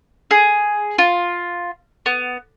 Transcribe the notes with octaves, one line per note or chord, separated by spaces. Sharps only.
G#4
F4
B3